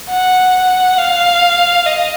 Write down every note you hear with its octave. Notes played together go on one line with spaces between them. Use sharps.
F#5
F5
D#5